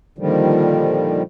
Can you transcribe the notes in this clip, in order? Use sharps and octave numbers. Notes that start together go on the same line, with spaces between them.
A#2 D3 D#3 F3 G3